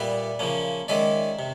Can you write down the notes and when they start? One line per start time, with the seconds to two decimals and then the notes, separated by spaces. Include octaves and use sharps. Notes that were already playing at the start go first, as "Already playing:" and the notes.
Already playing: A#2 G3 B3 D5 E5
0.39 C#3 F3 A#3 C#4
0.88 D#3 G#3 C#4 D5 E5
1.39 C3